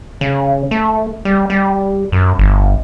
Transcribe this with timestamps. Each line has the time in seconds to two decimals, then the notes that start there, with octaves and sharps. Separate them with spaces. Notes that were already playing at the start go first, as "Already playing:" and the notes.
0.21 C#3
0.71 A3
1.25 G3
1.50 G3
2.12 F#2
2.39 G1